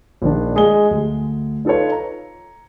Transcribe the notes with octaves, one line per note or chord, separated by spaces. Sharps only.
A#1 D#3 D4
G#3 G#4 D#5 G7
D2
D#4 F4 A4 B4 C#5
A#5